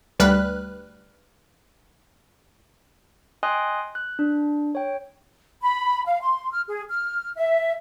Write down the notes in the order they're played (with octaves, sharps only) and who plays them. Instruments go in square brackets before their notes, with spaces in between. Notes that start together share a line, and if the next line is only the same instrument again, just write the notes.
[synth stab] D2 G3 B4 F6 F#6
[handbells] D#5 G5 G#5 C6 D#6 F#6
F#6
D4
C#5 G5
[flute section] B5
F5
C6
F6
G#4
F6
E5